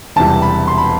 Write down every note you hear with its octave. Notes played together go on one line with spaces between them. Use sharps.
E1 E2 C3 E3 G3 A5
B5
C6
B5